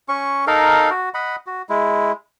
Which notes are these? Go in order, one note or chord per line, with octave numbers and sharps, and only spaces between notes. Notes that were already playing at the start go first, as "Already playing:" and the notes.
C#4 C#6
D#4 A4 A#4 F5
F#4
D#5 F#5 B5
F#4
G#3 E4